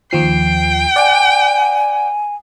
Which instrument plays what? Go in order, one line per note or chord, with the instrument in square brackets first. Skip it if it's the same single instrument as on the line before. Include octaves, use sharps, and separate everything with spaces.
[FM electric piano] D#2 F3 C7 [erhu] G5
[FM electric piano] D5 F#5 [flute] G#5